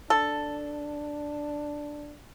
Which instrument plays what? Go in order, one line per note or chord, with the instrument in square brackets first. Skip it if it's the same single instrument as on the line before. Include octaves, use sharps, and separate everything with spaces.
[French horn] D4 [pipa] A4